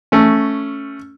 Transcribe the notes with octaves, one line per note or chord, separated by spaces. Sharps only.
A3 C#4